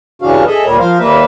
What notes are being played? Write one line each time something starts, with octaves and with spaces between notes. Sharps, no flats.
G2 C#3 E3 D4 F#4 F5
G#4 A4 D#5 E5
D2 A#2 G3 A#4 C#5
F3 A#4 C5 F5
D#2 G3 A#3 A#4 B4 E5